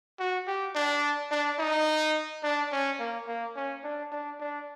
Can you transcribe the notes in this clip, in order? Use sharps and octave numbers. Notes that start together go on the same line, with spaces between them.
F#4
G4
D4
D4
D#4
D4
C#4
A#3
A#3
C#4
D4
D4
D4